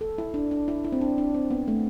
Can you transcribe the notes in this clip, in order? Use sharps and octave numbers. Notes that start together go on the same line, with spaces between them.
A4
E4
D4
D4
E4
E4
C4
D4
D4
C4
B3
A3